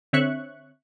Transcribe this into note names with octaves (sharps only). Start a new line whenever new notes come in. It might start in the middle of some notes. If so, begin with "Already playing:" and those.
D3 C4 C#5 E5 C#6 F#6